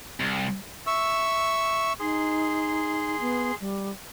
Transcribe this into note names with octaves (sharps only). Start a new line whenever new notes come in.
C2
E5 C#6 E6
D#4 G#4 C6
B3
G3